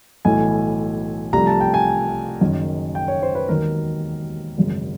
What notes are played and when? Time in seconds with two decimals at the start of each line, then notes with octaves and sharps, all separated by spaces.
0.25 B1 A2 E3 A3 G#5
1.33 C2 C3 F3 A3 A#5
1.47 A5
1.61 G5
1.74 G#5
2.41 F#1 F#2 D#3
2.95 G5
3.08 C#5
3.23 C5
3.35 B4
3.48 E1 D#2 D#3 F#3 A#4
4.57 G#1 F#2 C#3